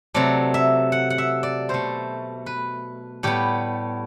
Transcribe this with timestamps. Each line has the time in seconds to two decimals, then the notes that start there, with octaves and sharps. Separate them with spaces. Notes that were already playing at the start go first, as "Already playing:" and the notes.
0.14 C3 F#3 A3 D5
0.54 E5
0.92 F#5
1.10 F#5
1.18 E5
1.43 D5
1.69 B2 A3 C5
2.46 B4
3.23 A2 G3 B3 G4